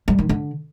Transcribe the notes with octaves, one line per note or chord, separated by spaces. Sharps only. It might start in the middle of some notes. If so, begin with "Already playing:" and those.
G3
D#3
D3